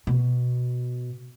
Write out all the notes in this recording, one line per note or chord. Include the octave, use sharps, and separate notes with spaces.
B2